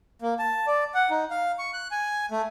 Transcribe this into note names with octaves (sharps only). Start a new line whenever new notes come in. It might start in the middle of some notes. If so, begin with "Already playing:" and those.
A#3
A5
D5
F#5
D#4
F5
C#6
F#6
G#5
A3